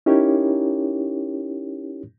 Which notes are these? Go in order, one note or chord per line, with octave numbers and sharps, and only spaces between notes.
C#4 D#4 E4 G4 A#4 C#5